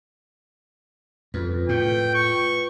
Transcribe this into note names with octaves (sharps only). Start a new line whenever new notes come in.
F2 F4 B4
A2 G5
C#6